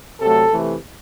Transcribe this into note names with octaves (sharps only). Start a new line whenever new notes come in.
C3 F#3 A3 A4
C3 E3 A3